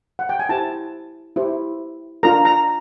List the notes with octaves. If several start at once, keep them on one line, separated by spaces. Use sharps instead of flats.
F#5
G5
G#5
E4 G4 C5 A5
E4 G4 C5
D4 F4 A#4 A#5
A#5